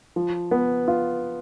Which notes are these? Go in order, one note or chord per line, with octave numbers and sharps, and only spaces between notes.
F3
B3
F4